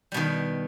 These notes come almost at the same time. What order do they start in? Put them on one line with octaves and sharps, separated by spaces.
G3 B2 D#3